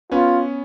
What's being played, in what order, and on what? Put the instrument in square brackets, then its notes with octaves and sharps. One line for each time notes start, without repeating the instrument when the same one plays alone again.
[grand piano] B3 C#4 [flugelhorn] F4